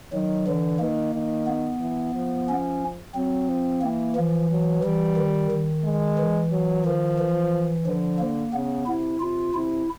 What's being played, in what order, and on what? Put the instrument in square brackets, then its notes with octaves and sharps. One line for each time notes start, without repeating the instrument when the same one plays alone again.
[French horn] D#3 [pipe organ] F#3
[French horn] D3 [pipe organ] E3
[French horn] D#3 [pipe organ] A#3
[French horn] D#3
[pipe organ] B3
[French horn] E3
F3
[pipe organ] C#4
[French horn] F#3 [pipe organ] C4
[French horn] F3
[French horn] E3 [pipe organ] A#3
[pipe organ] E3 [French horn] F3
[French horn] F#3
[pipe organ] E3 [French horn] G3
[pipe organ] D#3
D#3
[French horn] G#3
[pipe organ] E3
[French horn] F#3
[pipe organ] D#3 [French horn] F3
[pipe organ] E3
[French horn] D3 [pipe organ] F3
[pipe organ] A#3
[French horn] C#3 [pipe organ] B3
[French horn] C3 [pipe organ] E4
[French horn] C3 [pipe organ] F4
[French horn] C3 [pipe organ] E4